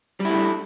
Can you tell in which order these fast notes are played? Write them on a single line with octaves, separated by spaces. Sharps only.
G3 E4 A3 D4